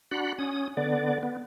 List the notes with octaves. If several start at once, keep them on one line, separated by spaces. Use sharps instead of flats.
D4 F#4 F#5 B5
C#4 D#6
D3 B3 D5
B3